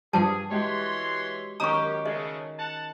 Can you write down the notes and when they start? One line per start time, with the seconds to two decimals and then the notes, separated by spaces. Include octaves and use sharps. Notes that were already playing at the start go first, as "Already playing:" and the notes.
0.13 G2 F3 G3 G#4 G5 A5
0.51 E3 G#3 F#4 G4 C#5 C6
1.60 F#2 D#3 C#4 G4 A#4 A#5 C#6 D#6
2.05 C#3 G#3 A3 G#4 D#5
2.59 F#5 A5